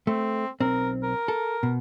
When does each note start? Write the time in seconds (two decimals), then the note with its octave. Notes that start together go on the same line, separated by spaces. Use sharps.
0.07 A3 C4
0.61 B1 C4 A#4
1.03 A#4
1.28 A4
1.63 B2